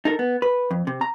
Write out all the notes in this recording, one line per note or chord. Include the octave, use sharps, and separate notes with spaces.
D#4 A4 A#4
B3
B4
F2
C3
A#5